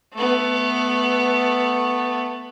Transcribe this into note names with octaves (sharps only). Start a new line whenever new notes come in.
A3 B3